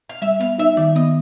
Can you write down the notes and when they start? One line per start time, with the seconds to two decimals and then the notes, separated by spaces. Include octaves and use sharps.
0.09 F5
0.22 G3 E5
0.40 B3 F5
0.58 D#4 E5
0.77 D#3 D5
0.96 B3 D#5